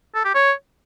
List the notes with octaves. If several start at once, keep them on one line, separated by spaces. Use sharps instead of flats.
A4
G4
C#5